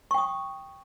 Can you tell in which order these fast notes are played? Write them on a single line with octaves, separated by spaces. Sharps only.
C#6 G5 D#6